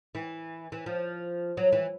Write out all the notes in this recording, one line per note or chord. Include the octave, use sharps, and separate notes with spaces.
E3
E3
F3
F#3
E3